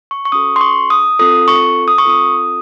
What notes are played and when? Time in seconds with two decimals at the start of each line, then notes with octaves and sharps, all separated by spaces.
0.11 C#6
0.25 C#6
0.32 C#4 F#4 A4 D#6
0.56 C6
0.61 C#6
0.90 D#6
1.19 C4 F4 A4 D#6
1.48 C#6
1.88 D#6
1.98 C#6
2.05 C4 F4 A4 D#6